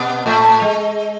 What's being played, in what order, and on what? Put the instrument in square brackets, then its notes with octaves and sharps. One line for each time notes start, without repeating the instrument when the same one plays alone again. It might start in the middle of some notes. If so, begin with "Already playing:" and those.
Already playing: [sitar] B2 B3
A2 A3
G#3